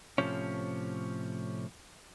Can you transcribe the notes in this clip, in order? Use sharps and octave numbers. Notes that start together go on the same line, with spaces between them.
A2 C3 F3 C#4